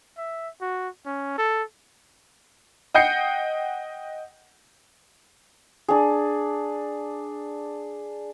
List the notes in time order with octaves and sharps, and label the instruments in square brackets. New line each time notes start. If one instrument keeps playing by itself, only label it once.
[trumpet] E5
F#4
C#4
A4
[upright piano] D#5 F#5 G5 G6 C7 C#7
[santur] D4 G#4